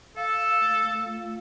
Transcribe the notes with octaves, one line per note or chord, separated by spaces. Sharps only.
A4 F5
F5
A3
A3
F4